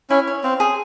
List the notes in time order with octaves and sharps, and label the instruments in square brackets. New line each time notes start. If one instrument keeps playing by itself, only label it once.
[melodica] C#4 [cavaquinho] E4
[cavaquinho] C#5
[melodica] C4 [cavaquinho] F5
[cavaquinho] G#4